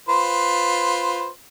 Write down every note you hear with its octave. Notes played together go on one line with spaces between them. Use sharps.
F4 B4 C5